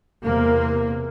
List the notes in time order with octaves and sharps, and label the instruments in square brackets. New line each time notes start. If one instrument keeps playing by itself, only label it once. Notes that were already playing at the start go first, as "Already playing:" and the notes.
[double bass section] E2 C3 A#3